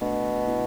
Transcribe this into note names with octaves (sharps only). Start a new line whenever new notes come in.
B2 A3 D4
B3 E4